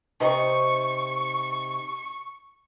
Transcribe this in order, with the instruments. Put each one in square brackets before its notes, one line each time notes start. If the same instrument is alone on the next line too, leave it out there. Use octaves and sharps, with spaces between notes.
[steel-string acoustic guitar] C3 D#4 C5 [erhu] C#6